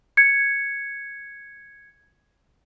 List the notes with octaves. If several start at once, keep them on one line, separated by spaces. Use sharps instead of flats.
G#6 C#7